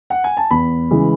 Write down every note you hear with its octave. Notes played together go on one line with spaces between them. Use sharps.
F#5
G#5
A5
E2 B5
C#3 E3 G#3